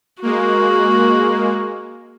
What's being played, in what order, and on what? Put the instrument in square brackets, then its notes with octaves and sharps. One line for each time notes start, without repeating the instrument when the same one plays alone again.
[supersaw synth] G#3 A#3 [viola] F#4